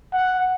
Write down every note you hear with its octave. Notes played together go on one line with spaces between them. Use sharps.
F#5